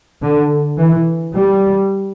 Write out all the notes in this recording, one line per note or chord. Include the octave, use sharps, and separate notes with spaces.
D3
E3
G3